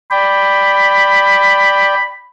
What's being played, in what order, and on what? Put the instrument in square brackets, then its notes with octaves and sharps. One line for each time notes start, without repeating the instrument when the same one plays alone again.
[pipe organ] D5 G5 [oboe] B5